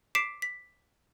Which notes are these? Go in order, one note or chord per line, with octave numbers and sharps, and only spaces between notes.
D6 B6 C7 D7 E7
B6